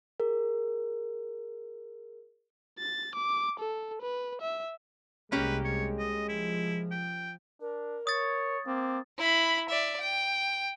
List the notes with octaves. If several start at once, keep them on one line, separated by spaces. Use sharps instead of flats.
G#4 A#4
A6
D6
A4
B4
E5
C2 G#3 A#3 C#4 G4 B4
G#3 C#5
D#5
F3 E4
G5
D4 A#4
C#5 D#6 A6
A#3 C4 D6
E4 B5
D5 E5
G5